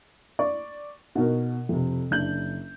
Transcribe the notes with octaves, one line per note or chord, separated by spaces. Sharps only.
D5 C#6
B2 D#4 F#4 A#4
F2 C3
F#1 D4 G6 F#7